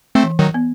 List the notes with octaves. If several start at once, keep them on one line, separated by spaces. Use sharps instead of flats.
A3 C4
E3
D#3 F#3
B3